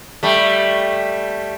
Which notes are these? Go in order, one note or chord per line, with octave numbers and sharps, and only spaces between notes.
G3 A3